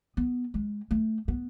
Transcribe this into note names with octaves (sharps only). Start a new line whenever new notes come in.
B3
G#3
A3
B3